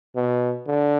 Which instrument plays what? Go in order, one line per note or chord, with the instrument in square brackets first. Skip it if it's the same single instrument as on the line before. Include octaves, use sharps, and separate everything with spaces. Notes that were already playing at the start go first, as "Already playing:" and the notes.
[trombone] B2
D3